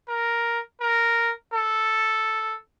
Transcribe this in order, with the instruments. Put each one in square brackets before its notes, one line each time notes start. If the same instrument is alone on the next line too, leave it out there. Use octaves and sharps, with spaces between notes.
[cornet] A#4
A#4
A4